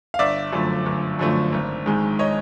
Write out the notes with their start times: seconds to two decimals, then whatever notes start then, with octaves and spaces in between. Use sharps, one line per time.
0.14 F5
0.19 G1 D5 E5
0.52 F#2 D3 F3 A3
0.86 G1
1.19 F#2 D3 F3 A3
1.52 G#1
1.86 G#2 D#3 G#3
2.19 C#5 D#5